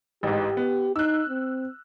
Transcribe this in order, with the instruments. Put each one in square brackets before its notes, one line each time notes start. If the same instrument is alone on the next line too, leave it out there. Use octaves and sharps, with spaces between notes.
[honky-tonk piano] A1 G#2 [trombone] G4
[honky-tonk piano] B3
[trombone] D#4 [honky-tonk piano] E6 F#6
[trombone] C4